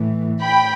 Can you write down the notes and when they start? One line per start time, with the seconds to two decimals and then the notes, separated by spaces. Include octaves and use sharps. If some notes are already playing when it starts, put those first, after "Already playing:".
Already playing: A2 E3
0.41 G5 B5